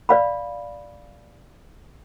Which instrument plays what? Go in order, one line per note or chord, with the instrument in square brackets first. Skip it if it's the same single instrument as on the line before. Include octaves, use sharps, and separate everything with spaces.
[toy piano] D5 F5 B5